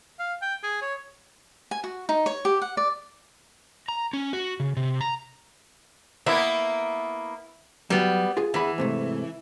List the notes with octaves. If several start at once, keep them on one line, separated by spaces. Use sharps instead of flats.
F5
G5
G#4
C#5
G#5
F#4
D#4
C#5
G4
F#5
D5
A#5
C#4
F#4
C#3
C3
A#5
A#3 B3 E4 E5
F#3 G3 B3
F4 G#4
E2 E3 G#4 B5
G#2 C3 A3